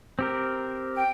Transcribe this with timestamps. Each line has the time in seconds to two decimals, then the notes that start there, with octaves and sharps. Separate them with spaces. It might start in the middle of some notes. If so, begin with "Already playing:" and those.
0.19 C4 G4 A#4
0.94 G5